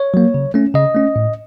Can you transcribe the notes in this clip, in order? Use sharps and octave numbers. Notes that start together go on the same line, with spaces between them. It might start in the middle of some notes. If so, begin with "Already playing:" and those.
Already playing: C#5
F#3 A#3
C#3
A3 C#4
C#3 D#5
A3 C#4
A2